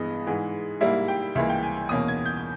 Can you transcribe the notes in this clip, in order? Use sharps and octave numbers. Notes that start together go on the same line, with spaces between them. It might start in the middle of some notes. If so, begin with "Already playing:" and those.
Already playing: G2 E3 G#3 B3 D#5
G#2 E3 G#3
G#2 G3 A#3 E4 E5
G5
C#2 C#3 E3 A#3 E5
G5
G#5
G#5
E2 B2 A#3 C#4 D#6
G#6
G6